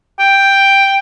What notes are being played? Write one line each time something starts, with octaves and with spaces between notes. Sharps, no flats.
G5